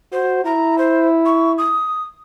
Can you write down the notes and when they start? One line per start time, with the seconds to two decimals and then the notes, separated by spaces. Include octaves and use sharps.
0.12 F#4 C5
0.45 E4 A#5
0.78 C5
1.26 C#6
1.58 D#6